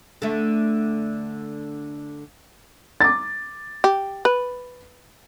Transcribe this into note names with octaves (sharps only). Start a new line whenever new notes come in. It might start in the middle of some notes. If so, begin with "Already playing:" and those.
D3 A3
D6 A6
G4
B4